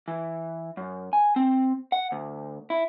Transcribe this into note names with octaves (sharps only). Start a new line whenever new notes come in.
E3
F#2
G#5
C4
F#5
D2
E4